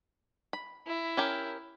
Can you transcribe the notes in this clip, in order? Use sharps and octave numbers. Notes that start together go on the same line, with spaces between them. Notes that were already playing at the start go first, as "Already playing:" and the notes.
B5
E4
C#4 G4 A#4